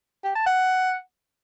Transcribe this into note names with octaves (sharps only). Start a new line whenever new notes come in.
G4
A5
F#5